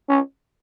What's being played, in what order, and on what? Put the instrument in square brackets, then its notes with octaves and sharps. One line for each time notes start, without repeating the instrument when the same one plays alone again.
[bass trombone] C#4